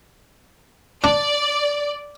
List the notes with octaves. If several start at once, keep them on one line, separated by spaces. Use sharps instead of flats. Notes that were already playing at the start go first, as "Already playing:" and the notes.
D4 D5